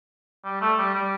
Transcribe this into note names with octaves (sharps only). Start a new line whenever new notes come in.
G3
A3
G3
G3